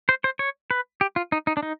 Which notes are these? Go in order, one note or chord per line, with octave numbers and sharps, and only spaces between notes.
C5
C5
C#5
B4
G4
F4
D#4
D#4
D4
D#4